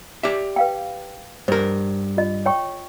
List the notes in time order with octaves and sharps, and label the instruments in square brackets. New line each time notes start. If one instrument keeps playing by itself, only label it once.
[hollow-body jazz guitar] G4 D5 E5
[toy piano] B4 F5 G5
[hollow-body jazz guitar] G2 A#4 [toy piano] C5
[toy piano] F4 D#5
C#5 G5 C#6